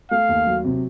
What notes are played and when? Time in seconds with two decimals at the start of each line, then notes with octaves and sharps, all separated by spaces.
0.11 A3 F5
0.29 D#2
0.47 F#3
0.65 C3